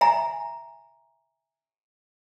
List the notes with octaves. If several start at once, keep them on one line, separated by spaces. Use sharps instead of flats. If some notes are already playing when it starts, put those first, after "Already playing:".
E5 G#5 A#5